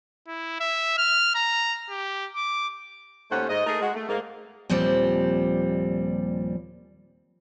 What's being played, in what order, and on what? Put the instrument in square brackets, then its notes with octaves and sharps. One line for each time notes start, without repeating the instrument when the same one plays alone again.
[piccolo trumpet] E4
E5
F6
A#5
G4
D6
[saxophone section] D#2 A3 C#4 C5 F#5
G#2 D#5
A3 D#4 G#4 A#4
G#3 F#4
A3
G#2 A#3
[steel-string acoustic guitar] D#2 A#2 F3 G3 C4